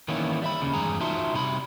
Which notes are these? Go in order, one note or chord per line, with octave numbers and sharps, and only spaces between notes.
D#3 E3 A#3 B3 C#4 E4
G3 E5 B5
D#2 C#3
E2 G2 G#3 G#4 A#5
D#4 F4 F#4 E5 A5 C6
C3 G3 D#4 B5